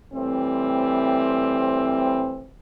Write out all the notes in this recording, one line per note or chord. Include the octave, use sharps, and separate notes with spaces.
A2 E3 G3 C4